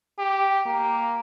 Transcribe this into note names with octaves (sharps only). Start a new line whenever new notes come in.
G4
A#3